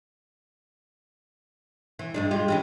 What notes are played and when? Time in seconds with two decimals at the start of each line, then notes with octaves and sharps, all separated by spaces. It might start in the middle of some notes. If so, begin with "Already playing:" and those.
1.99 E3
2.14 G2 G#3 D4
2.31 G#3 F4 G4
2.48 E3 G#3 C#4